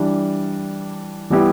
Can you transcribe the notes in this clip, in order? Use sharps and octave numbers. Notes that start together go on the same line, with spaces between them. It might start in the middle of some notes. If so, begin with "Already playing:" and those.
Already playing: E3 G3 D4
E3 G3 B3 E4 G4